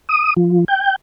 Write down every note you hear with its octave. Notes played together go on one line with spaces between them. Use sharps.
D#6
F3
G5